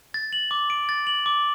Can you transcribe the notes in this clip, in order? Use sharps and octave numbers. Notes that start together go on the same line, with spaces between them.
A6
F#7
D6
D7
A6
F#7
D6